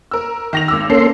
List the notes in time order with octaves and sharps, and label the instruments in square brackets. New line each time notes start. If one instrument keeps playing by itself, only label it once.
[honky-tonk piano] A#4 E6
D#3 A#6 F7
G#1 D6 E6
[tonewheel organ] A#3 C#4 C6 [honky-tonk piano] A4